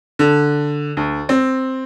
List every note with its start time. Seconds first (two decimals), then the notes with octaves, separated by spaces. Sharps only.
0.19 D3
0.97 D2
1.29 C4